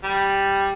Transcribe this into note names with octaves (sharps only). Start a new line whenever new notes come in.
G3